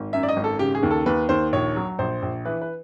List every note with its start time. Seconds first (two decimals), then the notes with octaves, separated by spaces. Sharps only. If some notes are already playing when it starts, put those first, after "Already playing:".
Already playing: G#1
0.13 F#2 E5
0.23 D5
0.29 D#5
0.36 G#1
0.44 A4
0.59 C#3 G4
0.75 G#4
0.83 D#2
0.91 A4
1.06 D#2 B4
1.29 D#2 C5
1.52 A#1 C#5
1.76 F#3
1.99 A#1 C5
2.22 A#1
2.45 E3 B4
2.61 B4